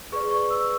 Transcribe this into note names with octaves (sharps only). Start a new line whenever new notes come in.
G#4 B4 D5 C#6
C#6
E6